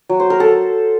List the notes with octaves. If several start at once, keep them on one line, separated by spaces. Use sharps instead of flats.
F#3
C5
A#4
A4